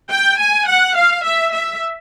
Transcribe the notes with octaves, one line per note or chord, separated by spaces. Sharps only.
G5
G#5
F#5
F5
E5
E5